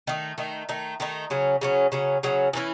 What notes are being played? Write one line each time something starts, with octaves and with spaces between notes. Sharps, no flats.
D#3 A3 D#4
D#3 A3 D#4
D#3 A3 D#4
D#3 A3 D#4
C#3 F#3 C#4
C#3 F#3 C#4
C#3 F#3 C#4
C#3 F#3 C#4
E3 A3 C#4 E4